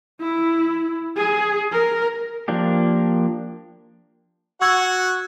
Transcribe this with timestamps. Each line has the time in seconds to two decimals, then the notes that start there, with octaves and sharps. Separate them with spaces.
0.21 E4
1.17 G#4
1.72 A#4
2.48 F3 A#3 D4 G4
4.61 F#4 F#5 C#6 E6 G#6